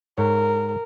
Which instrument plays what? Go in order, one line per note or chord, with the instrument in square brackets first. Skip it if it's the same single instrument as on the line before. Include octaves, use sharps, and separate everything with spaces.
[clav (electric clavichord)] G#2 C#5 [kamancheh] A#4